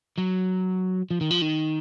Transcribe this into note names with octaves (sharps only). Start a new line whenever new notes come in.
F#3
F3
D#3
F3
D#3